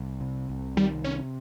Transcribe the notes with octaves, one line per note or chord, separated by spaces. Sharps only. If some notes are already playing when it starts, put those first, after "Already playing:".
Already playing: C2
C3
C2
D#3 G3
C3 C#4